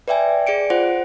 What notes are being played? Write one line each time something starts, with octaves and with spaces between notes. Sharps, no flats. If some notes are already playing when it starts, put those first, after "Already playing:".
B4 D5 E5 G5 G#5
G#4 D5 C#7 D7
F4 C5 F#5